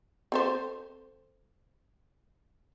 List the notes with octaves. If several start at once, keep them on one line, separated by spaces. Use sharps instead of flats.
C4 A4 C5